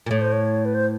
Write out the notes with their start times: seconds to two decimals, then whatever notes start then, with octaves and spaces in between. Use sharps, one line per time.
0.06 A#2
0.10 A2 C#5
0.21 C5
0.32 C#5
0.65 B4
0.75 C5